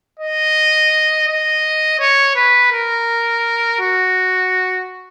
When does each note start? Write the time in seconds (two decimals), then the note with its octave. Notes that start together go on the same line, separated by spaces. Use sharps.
0.19 D#5
1.28 D#5
2.00 C#5
2.36 B4
2.72 A#4
3.80 F#4